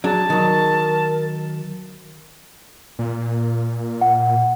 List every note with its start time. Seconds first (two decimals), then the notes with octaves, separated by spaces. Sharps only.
0.04 F#3 D4 G#4 A5
0.30 D#3 F#3 A#4
2.99 A#2
4.01 F#5